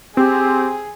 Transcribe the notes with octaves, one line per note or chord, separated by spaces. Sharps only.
C4 G4 G#4